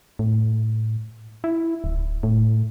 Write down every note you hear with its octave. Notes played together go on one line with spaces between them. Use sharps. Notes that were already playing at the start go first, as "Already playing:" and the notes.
A2
E4
D1
A2